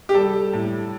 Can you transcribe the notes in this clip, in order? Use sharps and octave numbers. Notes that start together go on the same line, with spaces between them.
G4
G3 A4
A2